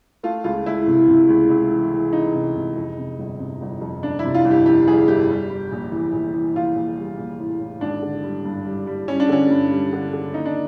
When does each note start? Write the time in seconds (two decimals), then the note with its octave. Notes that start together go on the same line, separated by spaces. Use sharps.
0.23 A3 F4
0.44 C#2 F4
0.66 C#2 E4
0.87 C3
1.08 C3
1.29 C#2
1.50 C#2
1.72 E3
1.93 E3
2.13 E3 D#4
2.35 C3
2.56 C3
2.76 F2
2.98 C3
3.18 G1
3.39 C3
3.61 G1
3.81 F2
4.03 G1 D4
4.19 E4
4.24 C3
4.35 F4
4.45 G1
4.51 G4
4.66 F2 G4
4.87 G1 G#4
5.08 G1 G4
5.29 G3
5.50 G3
5.72 A#1
5.92 E3
6.13 A#1
6.34 E3
6.55 A#1 F4
6.76 A#1
6.97 G3
7.19 A#1
7.39 A2
7.60 A2
7.81 G#1 D4
8.03 D3
8.23 G3
8.45 G2
8.66 G3
8.87 G3
9.08 G3 C#4
9.20 D4
9.29 D3 C#4
9.50 G2
9.71 G3
9.93 D3
10.13 D3
10.34 D#2 D#4
10.45 D4